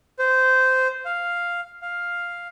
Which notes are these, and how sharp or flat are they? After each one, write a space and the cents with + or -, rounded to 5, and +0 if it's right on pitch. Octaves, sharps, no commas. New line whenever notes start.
C5 -15
F5 +0
F5 +5